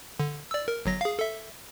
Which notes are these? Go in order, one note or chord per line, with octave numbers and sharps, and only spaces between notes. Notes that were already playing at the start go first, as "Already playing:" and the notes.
D3
D5 E6
A#4
G1 F#3 A#6
G#4 F5
A4 E5